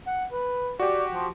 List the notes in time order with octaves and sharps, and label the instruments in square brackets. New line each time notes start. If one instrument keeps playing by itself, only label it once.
[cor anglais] F#5
B4
[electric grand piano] F#4 G4 [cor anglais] D5
[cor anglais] F3